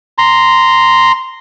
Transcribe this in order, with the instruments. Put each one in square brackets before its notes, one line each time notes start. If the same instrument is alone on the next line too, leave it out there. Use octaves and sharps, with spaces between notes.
[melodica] A#5 C6